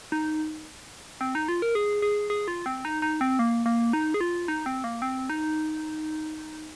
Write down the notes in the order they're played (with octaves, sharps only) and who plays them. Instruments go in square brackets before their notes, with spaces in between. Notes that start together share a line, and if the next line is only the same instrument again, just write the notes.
[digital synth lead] D#4
C4
D#4
F4
A#4
G#4
G#4
G#4
F4
C4
D#4
D#4
C4
A#3
A#3
D#4
G#4
F4
D#4
C4
A#3
C4
D#4